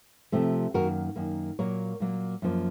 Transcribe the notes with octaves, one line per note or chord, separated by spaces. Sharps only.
C3 F3 A3
F#2 D#3 A#3 F#4 A#4
F#2 D#3 A#3
A#2 F#3 A#3 A#4 C#5
A#2 F#3 A#3
F#2 F3 A#3